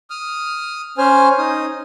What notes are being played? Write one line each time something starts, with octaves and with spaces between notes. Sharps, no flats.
D#6 F6
C#4 C5 G#5 F6
D#4 D#6